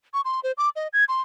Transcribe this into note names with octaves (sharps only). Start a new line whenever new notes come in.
C#6
C6
C5
D6
D#5
G#6
C6